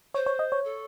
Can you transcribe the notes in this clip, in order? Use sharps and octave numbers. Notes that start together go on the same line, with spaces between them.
C5 C#5
C#5
D#5
C#5
A4